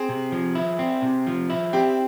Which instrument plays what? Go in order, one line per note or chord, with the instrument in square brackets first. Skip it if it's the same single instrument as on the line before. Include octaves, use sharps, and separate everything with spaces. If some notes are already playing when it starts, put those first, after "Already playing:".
Already playing: [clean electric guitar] C4 [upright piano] G#4
[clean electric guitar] C3
F3
E4
C4
C3
F3
E4
[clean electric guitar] C4 [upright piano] G4